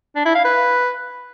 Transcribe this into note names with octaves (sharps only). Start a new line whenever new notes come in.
D4
E4
F5
B4